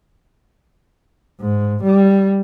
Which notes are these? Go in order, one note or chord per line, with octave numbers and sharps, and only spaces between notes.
G#2
G3